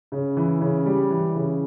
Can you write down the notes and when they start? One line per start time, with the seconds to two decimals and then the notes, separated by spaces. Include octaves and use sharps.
0.12 C#3
0.37 E3
0.61 C#3
0.86 G3
1.10 E3
1.35 C#3